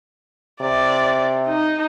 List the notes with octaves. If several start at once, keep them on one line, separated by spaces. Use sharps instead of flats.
C3 D5
D#4